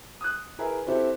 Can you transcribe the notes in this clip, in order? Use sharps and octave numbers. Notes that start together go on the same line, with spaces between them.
D#6 F#6
E4 G#4 A#4 B4 E5
C4 E4 G4 A4